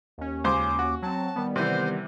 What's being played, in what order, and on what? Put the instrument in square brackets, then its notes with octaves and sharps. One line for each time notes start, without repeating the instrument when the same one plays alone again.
[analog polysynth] D#2 C#4
[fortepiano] C#2 C5 C6 [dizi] D6
[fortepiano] F#4
[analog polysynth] F#3 C4 [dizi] A5
[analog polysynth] D#3 G3 B3
[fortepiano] C3 E3 [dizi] C5